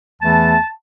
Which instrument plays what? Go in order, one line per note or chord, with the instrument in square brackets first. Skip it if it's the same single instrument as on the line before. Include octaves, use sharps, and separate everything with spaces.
[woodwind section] E2 E3 A3 A5